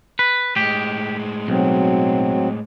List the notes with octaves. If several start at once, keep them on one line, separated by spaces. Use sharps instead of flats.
B4
A2 G#3 G4
B1 F#3 C4